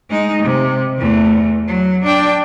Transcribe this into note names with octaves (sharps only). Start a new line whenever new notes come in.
G#3 D#4
C3
E2 A3
F#3
D4 G5